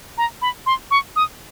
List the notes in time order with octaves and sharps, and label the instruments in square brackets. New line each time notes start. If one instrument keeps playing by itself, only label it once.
[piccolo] A#5
B5
C6
C#6
D#6